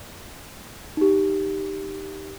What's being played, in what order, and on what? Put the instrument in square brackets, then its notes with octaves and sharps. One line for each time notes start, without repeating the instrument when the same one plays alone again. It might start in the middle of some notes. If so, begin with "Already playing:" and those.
[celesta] D#4 G4